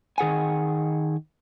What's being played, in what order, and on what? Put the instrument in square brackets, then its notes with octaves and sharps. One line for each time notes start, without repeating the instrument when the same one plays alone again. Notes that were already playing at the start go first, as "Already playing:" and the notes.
[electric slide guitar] D#3 G#4 F#5 G#5